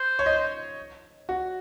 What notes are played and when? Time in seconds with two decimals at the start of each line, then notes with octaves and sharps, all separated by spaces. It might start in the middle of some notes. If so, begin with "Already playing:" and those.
Already playing: C5
0.19 C#5
0.26 D#5
1.29 F#4